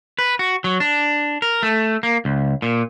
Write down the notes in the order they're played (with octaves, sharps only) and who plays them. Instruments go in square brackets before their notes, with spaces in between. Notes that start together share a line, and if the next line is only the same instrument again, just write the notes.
[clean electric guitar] B4
F#4
F#3
D4
A#4
A3
A#3
C#2
A#2